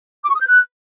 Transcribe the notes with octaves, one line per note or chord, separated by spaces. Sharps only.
D6
C#6
D#6
G6
F#6